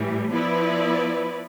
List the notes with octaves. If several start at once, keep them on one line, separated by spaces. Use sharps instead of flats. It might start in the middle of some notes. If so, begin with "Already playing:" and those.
Already playing: A2 E3 G3
F3 B3 E4 B4 D5